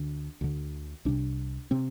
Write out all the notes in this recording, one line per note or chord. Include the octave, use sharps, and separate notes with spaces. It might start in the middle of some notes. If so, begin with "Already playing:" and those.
Already playing: D2 D3 D4
D2 D3
C2 C3 D4
C3 C4